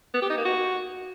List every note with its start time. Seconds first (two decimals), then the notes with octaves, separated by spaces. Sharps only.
0.14 B3
0.22 G4
0.29 D#4
0.37 A#3
0.45 F#4